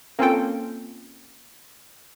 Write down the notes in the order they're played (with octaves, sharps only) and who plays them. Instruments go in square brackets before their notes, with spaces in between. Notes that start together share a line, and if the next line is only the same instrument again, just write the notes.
[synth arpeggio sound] A#3 C4 C#4 F4 A4 G5